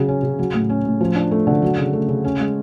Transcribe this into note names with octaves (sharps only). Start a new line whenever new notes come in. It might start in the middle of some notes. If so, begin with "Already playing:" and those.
Already playing: C#3 F#3
C#4
C#3
F#3
A2
C#4
A2
F3
D4
A3
D3
F#3
C#3
A3
C#3
C#4
G#3